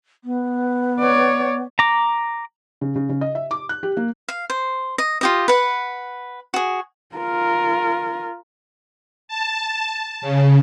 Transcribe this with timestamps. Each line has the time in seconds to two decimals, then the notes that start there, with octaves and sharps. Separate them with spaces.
0.24 B3
1.00 C#5 D5
1.79 A#5 D6
2.81 C#3
2.96 C#3
3.09 C#3
3.21 D#5
3.35 E5
3.51 D6
3.69 F#6
3.83 G4
3.97 A#3
4.29 F5
4.50 C5
4.98 D#5
5.21 F4 G4 D#5
5.48 B4 F#5
6.54 F#4 G#4
7.16 F4 A#4
9.28 A5
10.21 C#3